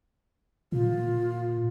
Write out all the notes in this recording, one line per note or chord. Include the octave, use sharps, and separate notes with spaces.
A#2 F4